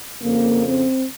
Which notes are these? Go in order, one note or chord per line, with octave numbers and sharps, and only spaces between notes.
F2 C#3 A#3
C4